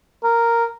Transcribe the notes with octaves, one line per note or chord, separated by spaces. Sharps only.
A#4